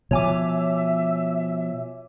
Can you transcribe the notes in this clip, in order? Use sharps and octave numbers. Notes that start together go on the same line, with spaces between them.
B2 F3 C#5 E5 G#5 D6